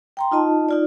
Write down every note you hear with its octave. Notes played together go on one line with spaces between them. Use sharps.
G5 A#5 C6
D#4 F4 D#5 A5
D#4 F4 D5